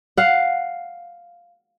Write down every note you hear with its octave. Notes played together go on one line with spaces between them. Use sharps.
F5 F#5